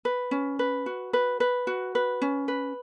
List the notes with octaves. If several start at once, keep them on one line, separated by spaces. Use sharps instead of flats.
B4
C#4
B4
F#4
B4
B4
F#4
B4
C#4
B4